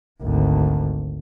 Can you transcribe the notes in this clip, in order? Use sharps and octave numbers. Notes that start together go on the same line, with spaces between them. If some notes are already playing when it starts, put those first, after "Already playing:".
G#1 D2